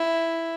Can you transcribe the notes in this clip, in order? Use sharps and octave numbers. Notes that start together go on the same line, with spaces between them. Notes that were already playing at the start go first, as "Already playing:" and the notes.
Already playing: E4